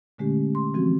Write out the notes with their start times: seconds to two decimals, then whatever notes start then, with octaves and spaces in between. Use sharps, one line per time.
0.18 A#2 D3 G#3 A3 C#4 G4
0.55 C6
0.74 E3 F3 G#3 C4 F#4